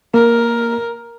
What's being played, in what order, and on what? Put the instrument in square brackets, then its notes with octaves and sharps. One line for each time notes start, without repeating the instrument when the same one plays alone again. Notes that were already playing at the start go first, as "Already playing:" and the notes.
[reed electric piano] A#3 [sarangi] A#4